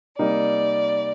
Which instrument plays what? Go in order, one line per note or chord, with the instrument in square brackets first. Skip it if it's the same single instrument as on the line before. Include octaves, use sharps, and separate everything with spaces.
[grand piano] C3 G3 A#3 D#4 A#4 [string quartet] D5